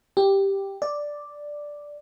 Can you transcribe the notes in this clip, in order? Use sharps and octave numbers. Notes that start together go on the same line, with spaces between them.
G4
D5